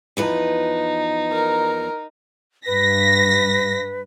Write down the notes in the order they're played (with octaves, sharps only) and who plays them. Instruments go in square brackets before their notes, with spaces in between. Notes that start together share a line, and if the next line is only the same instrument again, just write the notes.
[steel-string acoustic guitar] E2 F3 B4 [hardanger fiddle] D#4
[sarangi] A#4
[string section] G2 A#6 B6 [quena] B4